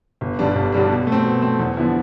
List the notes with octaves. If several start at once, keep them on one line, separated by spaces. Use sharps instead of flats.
G1
G2 D3 G3 D4
G1
G2 D3 G3 D4
B2
A3
C4
B2
A3 C4
E2
D3 F3 B3 E4